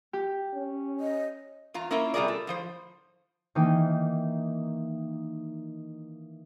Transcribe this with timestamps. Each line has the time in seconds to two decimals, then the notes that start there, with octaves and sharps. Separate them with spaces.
0.13 G4
0.54 C#4
1.00 D#5
1.74 E2 F4 A#5
1.91 A#3 C#4 E4 F4 A#4
2.14 C3 G3 F4 G#4 A#4 D5
2.28 A4
2.47 A2 F3 C5
3.55 D#3 E3 A#3 D#4